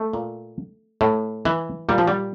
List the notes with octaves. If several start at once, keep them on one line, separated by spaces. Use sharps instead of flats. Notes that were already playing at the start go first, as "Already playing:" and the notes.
Already playing: A3
A#2
A2
E3
A#2 G3
F3
G3